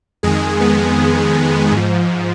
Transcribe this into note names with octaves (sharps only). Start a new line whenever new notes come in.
F2 D#3 G#3 G#4
B3
G#2 F3